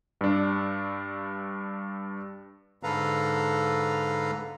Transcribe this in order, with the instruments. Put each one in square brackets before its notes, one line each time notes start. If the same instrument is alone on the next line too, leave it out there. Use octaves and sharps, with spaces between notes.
[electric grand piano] G2 D4
[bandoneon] G#2 D3 A4 B4 F5 A#5